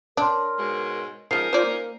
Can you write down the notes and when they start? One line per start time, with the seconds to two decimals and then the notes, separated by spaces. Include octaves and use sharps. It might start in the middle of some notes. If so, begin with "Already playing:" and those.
0.17 D4 A#4 C#5 C6
0.58 G#2 B2 G#3
1.31 F3 G#3 C#4 D#4 A#4 C7
1.53 F4 C5 D5
1.65 A#3